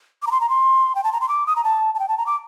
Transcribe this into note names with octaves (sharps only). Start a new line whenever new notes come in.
D6
A#5
C6
A#5
C6
G5
A5
A#5
C6
D6
D#6
A#5
A5
A5
G5
A5
A#5
D6